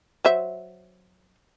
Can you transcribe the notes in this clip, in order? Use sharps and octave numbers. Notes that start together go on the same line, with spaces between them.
F#3 C5 E5